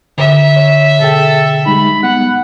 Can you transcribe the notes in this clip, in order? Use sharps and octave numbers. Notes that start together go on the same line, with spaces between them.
F#2 D3 E5
C#5
B2 G#4 A4 G5
G3 G#3 D#4 B5
B3 F#5